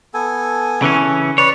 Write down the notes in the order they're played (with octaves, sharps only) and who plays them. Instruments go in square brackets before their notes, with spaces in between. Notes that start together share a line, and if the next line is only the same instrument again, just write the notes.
[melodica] B3 A4 G#5
[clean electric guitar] C#3 E3 C#4
[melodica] B4 D5 [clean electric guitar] C#5